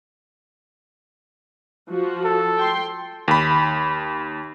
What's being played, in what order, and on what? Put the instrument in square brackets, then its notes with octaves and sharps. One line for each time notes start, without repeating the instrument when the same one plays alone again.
[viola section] F3 F#4
[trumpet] A4
[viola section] G5 C6
[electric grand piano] D#2 B5